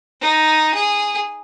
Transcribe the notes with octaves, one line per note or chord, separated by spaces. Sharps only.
D#4
G#4